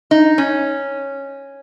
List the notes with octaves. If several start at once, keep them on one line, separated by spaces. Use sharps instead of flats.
D#4
C#4